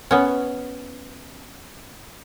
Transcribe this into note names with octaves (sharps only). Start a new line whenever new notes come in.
B3 C#4